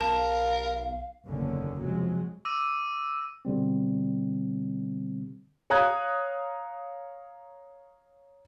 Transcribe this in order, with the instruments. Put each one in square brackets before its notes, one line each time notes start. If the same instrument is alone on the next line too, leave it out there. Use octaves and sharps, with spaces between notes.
[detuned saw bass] B1 [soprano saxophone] A#4 [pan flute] F5 [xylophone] A5
[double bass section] F#1 E2 A2 D3 D#3 C#4
C3 F3 F#3 G#3
[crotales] D6 E6 A#6 D#7
[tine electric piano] B2 D3 G3 C4
[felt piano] C#5 F5 A#5 D#6 F#6 G#6